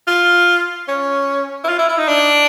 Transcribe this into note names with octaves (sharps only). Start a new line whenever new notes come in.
F4
C#4
E4
F4
E4
E4
D#4
D4